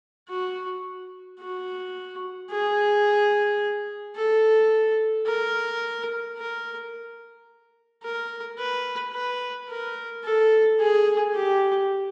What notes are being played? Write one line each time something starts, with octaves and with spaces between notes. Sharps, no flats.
F#4
F#4
G#4
A4
A#4
A#4
A#4
B4
B4
A#4
A4
G#4
G4